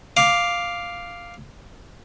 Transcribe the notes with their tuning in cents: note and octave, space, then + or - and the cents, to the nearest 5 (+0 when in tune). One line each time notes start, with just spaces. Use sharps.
F5 +0 D6 +0